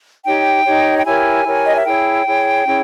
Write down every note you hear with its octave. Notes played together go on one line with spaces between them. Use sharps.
D#4 G4 C#5 G5
D#4 G4 C#5
G5
E4 G4 A#4 C#5 G#5
E4 G4 A#4 C#5
D#5
E5
E4 G#4 C#5 G5
E4 G#4 C#5
C#4 E4 G#4 C#5